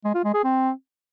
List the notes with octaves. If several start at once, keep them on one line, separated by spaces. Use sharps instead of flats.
G#3
F4
G#3
G#4
C4